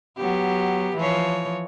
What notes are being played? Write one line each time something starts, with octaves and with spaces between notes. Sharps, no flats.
F#3 B3 G4
E3 F3 C#5